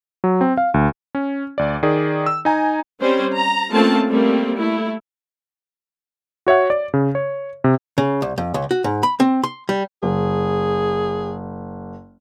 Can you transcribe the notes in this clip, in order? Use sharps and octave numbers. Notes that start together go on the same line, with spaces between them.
F#3
C4
F5
D2
C#4
D2 D5
D#3 G#4 D5
E6
D#4 G#5 A#5
G3 C4 C#4 C5
A#5
A3 A#3 C4 C#4 F4 A5
G3 A3 A#3 C4
A3 E4
F#4 C#5 E5 F#5
D5
C#3
C#5
C3
C#3
C2
F2
C#2
F#4
G#2
B5
C4
C6
G3
F#1 G#4